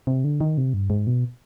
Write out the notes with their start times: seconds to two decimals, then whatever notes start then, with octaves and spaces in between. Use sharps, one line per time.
0.07 C3
0.24 D3
0.41 D#3
0.58 C3
0.74 G2
0.90 G#2
1.07 B2